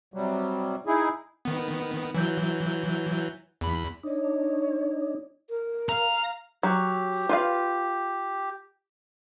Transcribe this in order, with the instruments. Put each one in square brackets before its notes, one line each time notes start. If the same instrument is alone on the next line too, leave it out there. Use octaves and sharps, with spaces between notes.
[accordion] C3 F#3 G3
D#4 E4 G#4
[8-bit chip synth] D#3 B3
E3 F#3 G6
E2 B5
[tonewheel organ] D4 D#4 [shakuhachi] C#5
[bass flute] A#4
[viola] F5 [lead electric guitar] A#5
[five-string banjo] F#3 [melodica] G4
[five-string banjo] F4 B4 F5